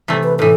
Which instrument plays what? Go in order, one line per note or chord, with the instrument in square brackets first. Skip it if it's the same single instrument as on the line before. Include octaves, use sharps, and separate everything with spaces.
[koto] C3 E3 A3
[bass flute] B4
[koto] A2 E3 [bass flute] A4